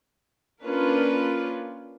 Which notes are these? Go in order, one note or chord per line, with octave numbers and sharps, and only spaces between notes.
A#3 C#4 D4 F4 A#4 B4